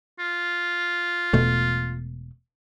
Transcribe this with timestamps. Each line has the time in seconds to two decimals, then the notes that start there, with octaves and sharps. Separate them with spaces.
0.19 F4
1.33 E1 B2 A3